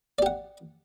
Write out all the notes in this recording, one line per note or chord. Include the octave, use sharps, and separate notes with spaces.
G4 D5 F#5